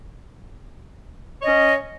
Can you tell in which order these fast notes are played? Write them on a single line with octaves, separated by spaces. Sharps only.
C#5 D#5 C#4